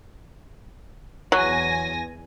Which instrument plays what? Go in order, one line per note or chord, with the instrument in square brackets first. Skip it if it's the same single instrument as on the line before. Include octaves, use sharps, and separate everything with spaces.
[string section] E2 G#5 A#6 [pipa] F#3